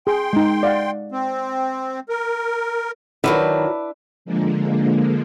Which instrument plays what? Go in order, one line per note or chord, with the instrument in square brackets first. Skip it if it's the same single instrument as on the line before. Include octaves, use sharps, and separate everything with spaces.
[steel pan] G#4 [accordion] G5 C6
[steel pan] G#3 D#4
D5 F5 F#5
[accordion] C4
A#4
[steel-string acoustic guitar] D#3 F3 F#3 [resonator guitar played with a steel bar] D4 E4 B4
[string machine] D3 F3 G#3 A#3